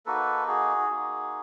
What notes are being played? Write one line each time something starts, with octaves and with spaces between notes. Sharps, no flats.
A#3 D#4 F#4 A4 B4
F#4 G#4
A#3 D#4 F#4